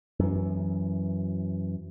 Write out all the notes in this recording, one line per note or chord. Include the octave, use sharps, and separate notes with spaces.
F#2 E3